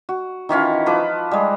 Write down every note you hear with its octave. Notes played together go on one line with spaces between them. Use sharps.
F#4
D#3 E3 C#4 F4
F3 B4 D6
G3 G#3